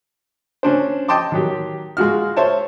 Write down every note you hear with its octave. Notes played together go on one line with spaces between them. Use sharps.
C#4 D4 C5
D#5 G5 A5 C6 D6
D#3 F#3 G4
G#3 F4 F#4 F6
C5 C#5 E5 A5